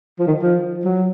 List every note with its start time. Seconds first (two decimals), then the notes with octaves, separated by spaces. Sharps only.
0.19 F3
0.27 D#3
0.42 F3
0.85 F#3